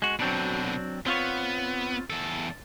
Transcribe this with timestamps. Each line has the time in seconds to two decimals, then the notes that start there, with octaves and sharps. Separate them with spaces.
0.02 G#3 F#4
0.20 B2 D3 F#3 C4 D4
1.06 B3 C4 F4 C#5
2.10 E2 A4